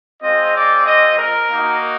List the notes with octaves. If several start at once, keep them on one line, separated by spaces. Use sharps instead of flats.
G#3 C4 F4 D#5
D5
D#5
A#4
A#3 D#4 F#4